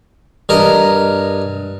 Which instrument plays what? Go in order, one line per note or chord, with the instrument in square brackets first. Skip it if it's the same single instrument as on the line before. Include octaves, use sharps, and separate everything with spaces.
[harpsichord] G2 A#4 D#5